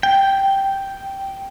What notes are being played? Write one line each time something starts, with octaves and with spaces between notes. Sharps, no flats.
G5